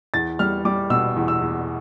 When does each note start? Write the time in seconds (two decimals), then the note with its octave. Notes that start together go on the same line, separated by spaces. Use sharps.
0.14 E2 A6
0.39 G3 F6
0.65 G3 D6
0.90 B2 E6
1.16 E2
1.28 E6
1.41 E2